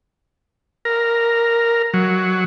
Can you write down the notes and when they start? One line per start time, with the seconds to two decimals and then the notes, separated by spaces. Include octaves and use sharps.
0.85 A#4
1.94 F#3